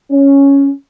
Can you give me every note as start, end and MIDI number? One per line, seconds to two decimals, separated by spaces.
0.11 0.70 61